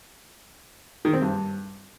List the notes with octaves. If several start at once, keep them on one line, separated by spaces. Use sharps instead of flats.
D#3
C4
G2